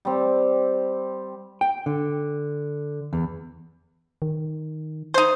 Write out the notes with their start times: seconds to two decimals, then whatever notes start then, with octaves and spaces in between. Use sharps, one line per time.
0.05 G3 C4
1.61 G5
1.86 D3
3.13 E2
4.22 D#3
5.14 D#4 C5